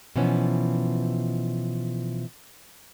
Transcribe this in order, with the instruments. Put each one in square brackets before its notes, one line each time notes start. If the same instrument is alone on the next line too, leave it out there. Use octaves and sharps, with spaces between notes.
[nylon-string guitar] B2 E3 F3 B3 C#4